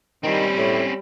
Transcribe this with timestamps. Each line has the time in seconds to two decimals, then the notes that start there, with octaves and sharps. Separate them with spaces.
0.23 D#3 G3 C4 C#4 E4
0.57 A2